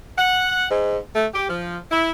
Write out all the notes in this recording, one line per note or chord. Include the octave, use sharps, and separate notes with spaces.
F#5
G#2
A3
G4
F3
E4